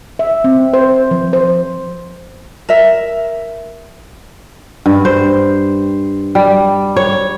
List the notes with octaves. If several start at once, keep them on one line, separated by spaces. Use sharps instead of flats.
E5
C4
C5
F3
C5
A#4 E5
G2
C5
G3
C#5